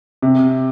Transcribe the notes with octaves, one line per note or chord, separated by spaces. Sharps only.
C3